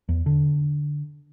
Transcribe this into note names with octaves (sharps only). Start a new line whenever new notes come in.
E2
D3